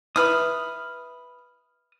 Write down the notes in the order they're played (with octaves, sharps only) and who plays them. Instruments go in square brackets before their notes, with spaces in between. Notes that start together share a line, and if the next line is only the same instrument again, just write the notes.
[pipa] E4 B4 [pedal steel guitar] D#6 F6